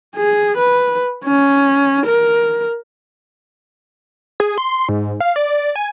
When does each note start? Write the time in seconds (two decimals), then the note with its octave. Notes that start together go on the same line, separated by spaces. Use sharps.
0.15 G#4
0.57 B4
1.24 C#4
2.06 A#4
4.40 G#4
4.58 C6
4.89 G#2
5.20 F5
5.36 D5
5.76 G#5